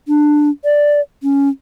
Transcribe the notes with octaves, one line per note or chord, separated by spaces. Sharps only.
D4
D5
C#4